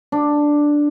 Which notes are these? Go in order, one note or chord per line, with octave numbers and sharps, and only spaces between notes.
D4